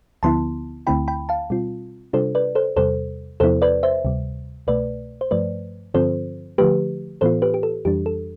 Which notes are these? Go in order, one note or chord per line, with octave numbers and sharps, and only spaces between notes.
D2 D3 F3 B3 E4 A5 C6
D2 D3 A3 C4 E4 G5 B5
G5 B5
F5 A5
B2 G3 C4 F4
C3 G3 D4 F4 A4 C5
B4 D5
A4 C5
E2 C3 G3 A4 C5
E2 C3 F3 B3 E4 A4 C5
B4 D5
C5 E5
D2 C3 G3
C2 B2 A3 B4 D5
C5
G2 F3 A3 B4 D5
G2 D3 F3 C4 F4 A4 C5
D3 F3 A3 G4 B4
A2 E3 B3 F4 A4 C5
G4 B4
G4
A4
F2 E3 G3 D4 G4
A4